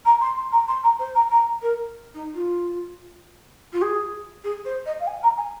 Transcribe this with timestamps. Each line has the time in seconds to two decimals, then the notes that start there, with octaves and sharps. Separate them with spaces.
0.05 A#5
0.21 C6
0.36 C6
0.51 A#5
0.68 C6
0.83 A#5
0.99 C5
1.14 A#5
1.30 A#5
1.61 A#4
2.14 D#4
2.34 F4
3.72 F4
3.81 G#4
4.43 G#4
4.65 C5
4.85 D#5
4.99 F5
5.06 G#5
5.23 A#5
5.37 G#5